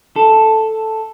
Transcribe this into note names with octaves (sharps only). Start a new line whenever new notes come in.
A4